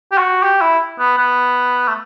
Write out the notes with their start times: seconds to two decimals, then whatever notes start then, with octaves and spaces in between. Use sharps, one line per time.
0.12 G4
0.18 F#4
0.43 G4
0.61 E4
0.99 B3
1.18 B3
1.88 A3